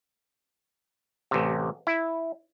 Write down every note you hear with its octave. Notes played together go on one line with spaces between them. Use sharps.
A1 C3
E4